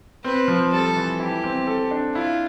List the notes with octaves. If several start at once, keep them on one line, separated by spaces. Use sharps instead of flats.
C4 B4
F3
G3 A4
E3
E4 G4
C4
A4
D4
E4 F4